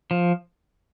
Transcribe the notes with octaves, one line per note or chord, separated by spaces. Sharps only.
F3